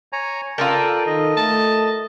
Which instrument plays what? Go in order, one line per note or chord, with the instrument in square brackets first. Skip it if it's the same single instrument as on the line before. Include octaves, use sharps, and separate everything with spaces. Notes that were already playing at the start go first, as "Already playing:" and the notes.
[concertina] C#5 G#5 A#5
[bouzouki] F4 A4 A#4 [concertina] D5 G5 A5
[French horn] D#3 [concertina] D#5
[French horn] A3 [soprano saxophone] A5